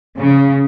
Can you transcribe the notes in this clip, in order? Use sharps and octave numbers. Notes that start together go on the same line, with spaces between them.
C#3